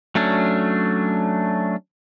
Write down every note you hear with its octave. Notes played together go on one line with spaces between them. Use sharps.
F#3 A3 C#4 D4